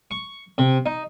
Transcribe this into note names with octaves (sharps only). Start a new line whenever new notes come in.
C#6
C3
D#4